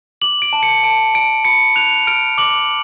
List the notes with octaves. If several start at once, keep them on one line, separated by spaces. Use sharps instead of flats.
D6 F#7
D7
A5
C#7
A5 D7
A5 D7
B5 C#7
F#6 F7
F6 D7
D6 F#7